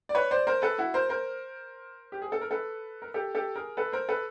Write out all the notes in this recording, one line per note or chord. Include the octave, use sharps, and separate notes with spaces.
D5
B4 C#5
C5 D5
A#4 C5
A4 B4
E4 F#4
A#4 C5
A#4 C5
G4
G#4
A4
A#4
A4 B4
A#4
G4 A4
G4 A4
G#4 A#4
A4 B4
A#4 C5
A4 B4